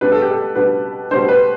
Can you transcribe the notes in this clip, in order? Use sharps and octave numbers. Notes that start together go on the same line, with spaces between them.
B2 G3 B3 D4 B4
A4
G4
A4
B2 G3 B3 D4 B4
B2 G3 B3 D4 C5
B4